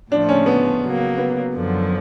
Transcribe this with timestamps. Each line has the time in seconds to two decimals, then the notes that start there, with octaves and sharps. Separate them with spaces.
0.11 A2 F3 A3 D4
0.29 C#4
0.46 B3
0.82 C#3 F#3 A#3
1.18 B3
1.54 F#2 D3 F3